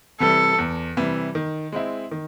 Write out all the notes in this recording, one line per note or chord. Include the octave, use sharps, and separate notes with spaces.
C3 E3 G3 A4
E2
C3 E3 G3
D#3
G#3 C4 E4
D#3